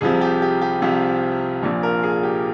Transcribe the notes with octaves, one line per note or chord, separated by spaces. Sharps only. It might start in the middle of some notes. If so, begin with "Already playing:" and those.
C2 C3 F3 G#4
G4
G4
G4
C2 C3 F3
A#1 A#2 F3
A#4
G#4
G4